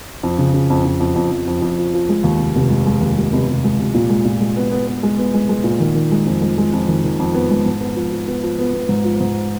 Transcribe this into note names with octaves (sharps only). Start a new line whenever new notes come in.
F2
C#3
C#3
F2
F2
F2
F2
F2
F2
F2
F3
F3
G#3
D#2
F1
F1
G#3
G#3
D#2
G#3
F1
F1
G#3
F1
A#2
G#3
A#2
G#3
B3
B3
B3
G#3
B3
G#3
G#3
A#2
D#3
D#3
G#3
F2
G#3
G#3
F2
D#3
D#3
F2
B3
G#3
G#2
B3
F3
F3
B3
F3
B3
B3
G#2
F3
G#2